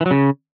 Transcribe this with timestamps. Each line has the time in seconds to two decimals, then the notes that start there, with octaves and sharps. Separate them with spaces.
0.01 E3
0.06 F#3
0.11 C#3